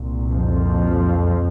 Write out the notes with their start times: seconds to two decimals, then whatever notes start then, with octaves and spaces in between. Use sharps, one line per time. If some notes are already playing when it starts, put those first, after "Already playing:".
Already playing: C2 A#2
0.30 F2 F3